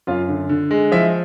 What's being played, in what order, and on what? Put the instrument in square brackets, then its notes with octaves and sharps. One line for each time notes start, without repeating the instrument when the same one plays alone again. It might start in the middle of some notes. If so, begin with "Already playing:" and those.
[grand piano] F#2 F4 F5
D3
D3
G#3
F3 E4 E5